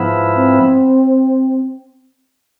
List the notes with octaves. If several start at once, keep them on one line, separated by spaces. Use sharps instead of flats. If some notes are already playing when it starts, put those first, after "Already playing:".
Already playing: G#2 F3 B3 E4
C4